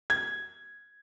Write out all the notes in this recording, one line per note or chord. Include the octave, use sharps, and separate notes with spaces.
G#6